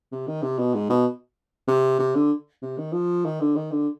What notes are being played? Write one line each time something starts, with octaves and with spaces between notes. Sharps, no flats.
C3
D#3
C3
B2
G#2
B2
C3
C3
D3
C3
D#3
F3
D#3
D3
D#3
D3